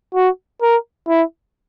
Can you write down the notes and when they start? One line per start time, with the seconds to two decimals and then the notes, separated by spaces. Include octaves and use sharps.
0.15 F#4
0.62 A#4
1.08 E4